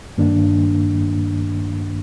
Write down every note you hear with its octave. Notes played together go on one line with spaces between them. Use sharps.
G2 D#3 A#3 D4